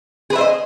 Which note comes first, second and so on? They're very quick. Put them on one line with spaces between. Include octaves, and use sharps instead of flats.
G#4 B4 E5 C5 D#5